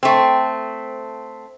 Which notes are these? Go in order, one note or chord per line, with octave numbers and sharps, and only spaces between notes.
A3 C4